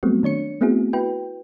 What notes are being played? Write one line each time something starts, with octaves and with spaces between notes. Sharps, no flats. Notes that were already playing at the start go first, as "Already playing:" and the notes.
F#3 G3 A3 B3 C4 F#4
D#3 D4 C#5 C#7
A3 B3 C4 E4 F#4 G#4
E4 F#4 B4 G5